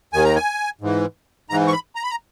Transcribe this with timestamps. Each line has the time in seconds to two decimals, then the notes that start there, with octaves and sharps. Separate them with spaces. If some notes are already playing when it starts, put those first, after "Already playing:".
0.13 D#2 D#3 G#5
0.24 A#5
0.36 G#5
0.81 G#2 E3
1.50 G#2 E3 A#5
1.68 C#6
1.73 B5
1.95 A#5
2.03 B5
2.11 A#5